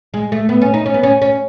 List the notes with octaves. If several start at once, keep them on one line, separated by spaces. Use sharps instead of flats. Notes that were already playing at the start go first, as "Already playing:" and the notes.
G#3
A3
B3
C#4
D#4
C#4
B3
C#4
C#4